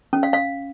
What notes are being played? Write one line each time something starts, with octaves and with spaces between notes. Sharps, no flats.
C#4
F5
F5